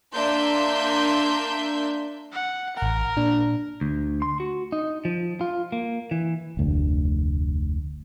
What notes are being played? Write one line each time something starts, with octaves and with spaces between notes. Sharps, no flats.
A#3 D4 E5 C6 G6
F#5
A1 A#4 F#5
A#2 D4
D2
C6
F#4
D#4
F3
F4
A#3
E3
F1 D2